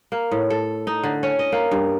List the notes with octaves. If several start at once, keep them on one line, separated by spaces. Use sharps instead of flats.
A#3
A2
A4
D#4
D3
C#4
D#5
A#3
G2